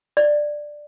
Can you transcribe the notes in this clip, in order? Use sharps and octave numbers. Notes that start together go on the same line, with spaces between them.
D5